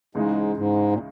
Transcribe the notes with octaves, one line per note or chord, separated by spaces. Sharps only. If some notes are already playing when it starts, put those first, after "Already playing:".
C#2 G#2 C#3 E3 G#3 D#4
G#2
A#2